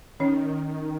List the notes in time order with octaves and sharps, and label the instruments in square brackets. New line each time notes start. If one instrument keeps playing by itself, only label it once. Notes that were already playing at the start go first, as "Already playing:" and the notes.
[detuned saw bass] D#3 [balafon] C#4 C#5